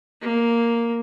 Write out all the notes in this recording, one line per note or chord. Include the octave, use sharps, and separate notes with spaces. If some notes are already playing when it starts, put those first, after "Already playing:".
A#3